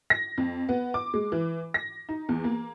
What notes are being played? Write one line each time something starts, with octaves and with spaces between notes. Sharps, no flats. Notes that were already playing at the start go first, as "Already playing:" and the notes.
A#6
F2
B3
D6
G#3
E3
A#6
D#4
E2
A#3